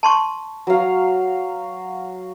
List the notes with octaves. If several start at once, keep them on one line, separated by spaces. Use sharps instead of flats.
A5 C6 C#6
F#3 F5